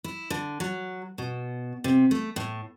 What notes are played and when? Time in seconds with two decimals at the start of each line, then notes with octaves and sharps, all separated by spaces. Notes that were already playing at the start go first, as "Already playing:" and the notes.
0.04 E4
0.30 D3
0.60 F#3
1.18 B2
1.84 C3
2.11 A3
2.36 A2